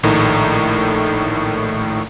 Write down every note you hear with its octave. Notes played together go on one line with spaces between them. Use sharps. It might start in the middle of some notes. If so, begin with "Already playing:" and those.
A#1 A2 D#3 A3 A#5